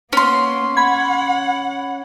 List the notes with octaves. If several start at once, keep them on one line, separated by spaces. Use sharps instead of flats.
A#3 B3 C#4 C6
F#5 B5 G#6